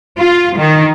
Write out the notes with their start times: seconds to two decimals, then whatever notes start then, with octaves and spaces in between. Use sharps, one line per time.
0.18 F4
0.58 D#3